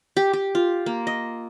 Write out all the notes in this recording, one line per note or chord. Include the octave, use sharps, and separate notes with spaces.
G4
G4
F4
A#3
D#5